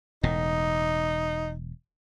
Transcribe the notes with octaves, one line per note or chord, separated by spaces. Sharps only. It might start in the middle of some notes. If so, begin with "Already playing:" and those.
E1 A2 D#4